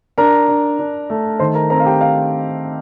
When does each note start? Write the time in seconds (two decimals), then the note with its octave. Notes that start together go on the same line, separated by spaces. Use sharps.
0.18 D4 A#4 A#5
0.48 D4
0.79 D4
1.10 A3
1.39 D#3 C5 C6
1.54 A#4 A#5
1.70 C4 A#4 A#5
1.80 F5
1.85 G4 G5
2.01 F5